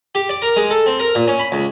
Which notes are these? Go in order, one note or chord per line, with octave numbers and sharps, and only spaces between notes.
G4
D5
A#4
G#3
A4
C4
A#4
A#2
C#4
B5
C#2